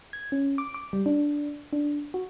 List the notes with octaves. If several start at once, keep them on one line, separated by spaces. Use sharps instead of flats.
G#6
C#4
D6
D6
G3
D4
D4
F#4